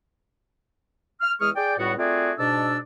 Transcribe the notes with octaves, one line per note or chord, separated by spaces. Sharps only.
F6
E2 G#3 G#4 C#6 D#6 F6
G#4 D5 G5
C#2 A2 G3 B3 F#4
A3 C4 F4 F#4 G#4 D5
G#2 B2 D4 D5 A5 E6